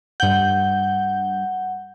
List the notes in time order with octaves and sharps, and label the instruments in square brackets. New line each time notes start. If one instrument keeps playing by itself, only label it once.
[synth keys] G2 G6 [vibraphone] F#5